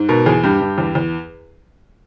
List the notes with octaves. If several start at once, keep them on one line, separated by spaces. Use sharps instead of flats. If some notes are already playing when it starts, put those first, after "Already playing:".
Already playing: G#2
B2 A#4
E2 G#4
G2 G4
G2
E2
E2